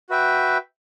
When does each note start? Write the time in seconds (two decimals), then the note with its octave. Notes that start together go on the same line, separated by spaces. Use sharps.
0.09 F#4 B4 E5 G5